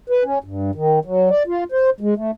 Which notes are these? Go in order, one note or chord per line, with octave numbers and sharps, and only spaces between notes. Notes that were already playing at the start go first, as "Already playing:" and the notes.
B4
C#4
G2
D#3
F#3
D5
F4
C5
G#3
A3